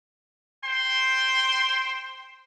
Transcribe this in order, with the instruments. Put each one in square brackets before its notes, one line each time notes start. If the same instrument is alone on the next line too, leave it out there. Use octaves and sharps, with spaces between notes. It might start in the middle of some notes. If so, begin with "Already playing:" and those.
[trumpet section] C5 G5 C6